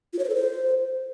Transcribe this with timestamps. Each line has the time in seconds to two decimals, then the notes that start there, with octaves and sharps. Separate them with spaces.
0.13 F4
0.19 C#5
0.24 C5
0.29 A4
0.35 C5